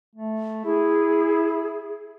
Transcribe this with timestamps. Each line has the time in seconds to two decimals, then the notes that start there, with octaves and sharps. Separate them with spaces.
0.15 A3
0.65 E4 G#4